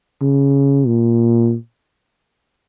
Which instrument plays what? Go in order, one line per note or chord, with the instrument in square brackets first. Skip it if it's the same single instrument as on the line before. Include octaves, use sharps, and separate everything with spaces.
[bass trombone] C#3
A#2